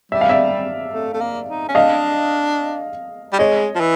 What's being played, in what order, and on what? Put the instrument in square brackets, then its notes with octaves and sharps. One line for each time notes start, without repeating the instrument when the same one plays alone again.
[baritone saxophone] G3 [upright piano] E5
[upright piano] F5
D5 E5
[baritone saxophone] A3
A3
A#3
D#4
C#4
[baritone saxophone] D4 [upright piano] D#5 F5
[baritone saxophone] G3
[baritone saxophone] G#3 [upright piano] C#5 D#5
[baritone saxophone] F3
E3